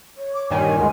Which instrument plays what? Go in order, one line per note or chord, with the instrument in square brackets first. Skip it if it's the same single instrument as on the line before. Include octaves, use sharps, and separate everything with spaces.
[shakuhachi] C#5
[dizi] D6
[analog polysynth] G2 A#2 D#3 [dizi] G#5
[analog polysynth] D2 G2 D3 [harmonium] G#3 [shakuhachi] A#4